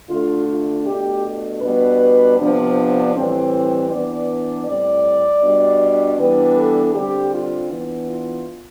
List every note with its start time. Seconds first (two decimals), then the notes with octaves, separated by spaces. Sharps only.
0.10 D3 A3 D4 F4
0.48 F4
0.86 B2 A3 D4 G4
1.62 B2 G3 B3 D4 B4
2.38 C3 F3 B3 D4
3.15 A2 E3 G3 C4
3.90 E3 B3 D4 D5
4.67 A2 G3 C4 D5
5.43 B2 G3 D4
6.19 E3 G3 B3 D4 B4
6.57 A4
6.95 D3 G3 C4 G4
7.33 F4
7.71 E3 B3 D4
8.09 F4